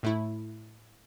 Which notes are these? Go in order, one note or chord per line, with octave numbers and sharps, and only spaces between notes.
A2 A3 E4